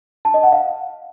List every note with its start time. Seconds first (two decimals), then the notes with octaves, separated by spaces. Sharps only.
0.25 A5
0.34 D#5
0.43 F#5
0.52 F5